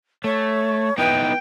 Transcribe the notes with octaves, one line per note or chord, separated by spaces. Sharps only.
A3 C#5
B3 D#4 E4 B4 G5